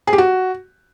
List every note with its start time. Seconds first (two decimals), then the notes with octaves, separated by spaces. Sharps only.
0.07 G#4
0.13 G4
0.18 F#4